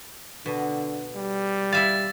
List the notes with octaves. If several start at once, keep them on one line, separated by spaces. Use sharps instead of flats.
B2 D3
G3
E4 E5 F5 A6